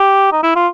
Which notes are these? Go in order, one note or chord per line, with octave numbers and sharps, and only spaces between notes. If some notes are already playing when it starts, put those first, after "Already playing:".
Already playing: G4
D#4
E4
F4